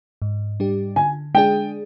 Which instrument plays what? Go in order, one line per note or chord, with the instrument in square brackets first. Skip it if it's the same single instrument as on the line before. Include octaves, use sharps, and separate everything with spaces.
[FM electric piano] G#2
G3 D4 G4
[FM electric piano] D3 [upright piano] G#5
[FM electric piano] G#3 D4 G#4 [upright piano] G5